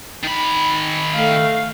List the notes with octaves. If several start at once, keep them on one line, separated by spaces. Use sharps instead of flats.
D#3 B5
A3 F5